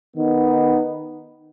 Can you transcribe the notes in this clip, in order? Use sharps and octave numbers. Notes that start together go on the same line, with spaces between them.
D#3 B3 D#4